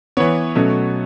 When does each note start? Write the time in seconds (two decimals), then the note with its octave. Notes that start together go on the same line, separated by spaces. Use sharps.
0.17 E3 B3 C#5
0.55 B2 F#3 A3 C#4